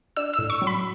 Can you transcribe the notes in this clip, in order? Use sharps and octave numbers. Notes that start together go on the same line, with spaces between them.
D4 E6
A2 E6
C#6
F#3
B5